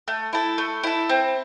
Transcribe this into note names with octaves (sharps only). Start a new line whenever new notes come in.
A3
E4 A4
A3
E4 A4
C4